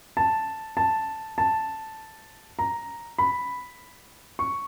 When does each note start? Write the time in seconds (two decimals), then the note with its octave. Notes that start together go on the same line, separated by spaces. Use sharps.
0.17 A5
0.77 A5
1.38 A5
2.59 A#5
3.18 B5
4.39 C#6